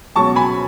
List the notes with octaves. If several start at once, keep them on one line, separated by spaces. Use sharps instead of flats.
C#2 B2 F#3 C#4 A5 C#6
G#5 B5